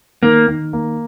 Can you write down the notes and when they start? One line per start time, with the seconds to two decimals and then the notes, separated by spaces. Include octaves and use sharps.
0.22 D#3 A#3
0.48 D#3
0.73 A#3